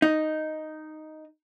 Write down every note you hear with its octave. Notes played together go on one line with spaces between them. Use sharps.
D#4